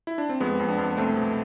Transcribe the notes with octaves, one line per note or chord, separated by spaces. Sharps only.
E4
D4
C4
F2 G#3 B3
F2
B3 D4
F2
B3
C2 A3 C4
B2